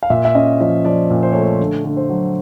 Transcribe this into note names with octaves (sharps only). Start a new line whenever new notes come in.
F5
A#2 E5
E5
C#4 D#5
F3 D#5
F3 D5
A#2
C5
A3 C#5
C5
D3
D3
C5
F#3